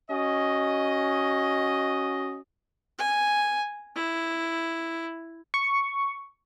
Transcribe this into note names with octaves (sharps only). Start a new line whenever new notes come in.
C#4 F#4 D#5
G#5
E4
C#6